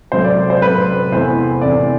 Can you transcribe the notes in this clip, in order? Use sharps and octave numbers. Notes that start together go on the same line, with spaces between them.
C3 F#3 A3 C5
D5
D5
C5
C3 F#3 A3 B4
E2 C3 E3 A3 C5
E2 C3 E3 A3 D5